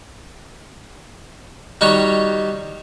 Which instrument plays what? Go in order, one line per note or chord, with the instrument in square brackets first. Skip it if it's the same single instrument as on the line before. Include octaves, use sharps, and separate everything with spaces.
[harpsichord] D#3 G3 F#4 C#5